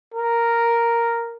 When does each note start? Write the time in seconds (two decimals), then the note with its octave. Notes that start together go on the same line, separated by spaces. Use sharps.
0.14 A#4